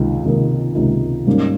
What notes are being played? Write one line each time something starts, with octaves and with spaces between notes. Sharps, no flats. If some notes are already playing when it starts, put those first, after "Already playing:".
Already playing: C#2 C3 D#3 A#3 D#4
C#2 C3 D#3 A#3 D#4
C#2 C3 D#3 A#3 D#4
G#2 G3 A#3 C#4